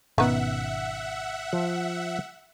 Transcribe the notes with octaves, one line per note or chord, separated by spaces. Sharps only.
G#1 B2 D#3 B3 C#4 E5 F#5
F3